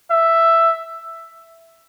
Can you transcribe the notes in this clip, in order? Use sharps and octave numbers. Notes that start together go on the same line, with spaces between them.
E5